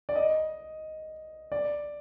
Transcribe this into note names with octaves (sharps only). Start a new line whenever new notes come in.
D5
D#5
D5